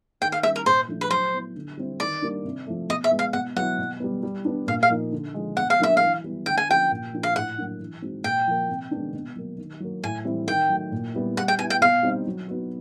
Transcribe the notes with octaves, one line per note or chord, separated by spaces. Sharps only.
D#3 G5
F5
G3 A#3 C#4 E5
A#4
A#2 C5
F3 A3 D4
B4
F#3 C5
B3 E4
D3
G3 C4 E4
D#3 D5
G3 A#3 D4
C3
F3 A3
B2 D#5
E5
G#3 B3
F5
B2 F#5
F#3 B3 E4 F#5
B2
G3 B3
G3
B3 D4
A#2 F5
F5
F3 A#3 D#4
D3
F3 G#3
B2 F#5
F5
F#3 A#3 D4 E5
E3 F5
G3 B3 E4
D3 G5
G#5
F3 A#3 C#4 F4 G5
A#2
F3 A#3 D4 F4
F5
A2 F#5
F#3 A#3 D4
E3
G#3 C4 D#4 F#4
A#2 G5
F3 A#3
C3
D#3 G#3 B3 D4
B2
F#3 A#3
D#3
F#3 A#3
A2 G#5
E3 G3 C4 E4
D#3 G5
F#3 A3
A#2
G3 B3 E4
G3 F#5
G5
B3 E4 G#5
G5
B2 F5
G3 C4 D#4
F#3
B3 D#4 F#4